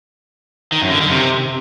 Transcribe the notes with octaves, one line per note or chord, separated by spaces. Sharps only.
D#3
F#2
D3
D#3
C3